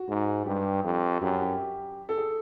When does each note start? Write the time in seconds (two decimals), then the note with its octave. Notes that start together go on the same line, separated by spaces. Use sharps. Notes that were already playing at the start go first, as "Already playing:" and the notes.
Already playing: F#4
0.09 G#2
0.46 G2 G4
0.84 F2
1.21 F#2 G4
1.41 G4
2.09 A4
2.17 G#4